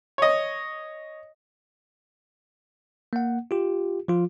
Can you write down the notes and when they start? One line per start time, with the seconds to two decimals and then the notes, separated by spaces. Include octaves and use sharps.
0.18 C#5 D#5
3.13 A#3 F#5
3.51 F4 G4
4.08 F3 F4